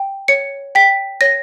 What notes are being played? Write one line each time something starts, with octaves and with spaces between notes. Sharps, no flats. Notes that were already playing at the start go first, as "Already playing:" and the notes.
Already playing: G5
C#5 C#7
G5 B6
C#5 A#6